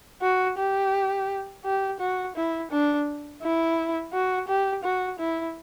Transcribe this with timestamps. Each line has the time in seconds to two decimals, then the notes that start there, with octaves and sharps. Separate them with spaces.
0.22 F#4
0.58 G4
1.65 G4
2.00 F#4
2.36 E4
2.71 D4
3.42 E4
4.13 F#4
4.48 G4
4.84 F#4
5.19 E4